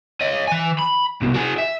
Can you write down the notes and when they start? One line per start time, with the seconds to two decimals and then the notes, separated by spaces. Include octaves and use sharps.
0.21 C#5 D#5
0.48 E3 G#5
0.79 B5
1.21 C2 B2
1.34 F#4 G#4
1.58 E5